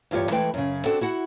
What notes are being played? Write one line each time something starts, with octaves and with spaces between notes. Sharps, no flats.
E2 G2 F4 G4 C#5
E3 G#3 A3 B4 G5
F#2 C#3
C4 D4 F#4 A4
E4 F#4 F#5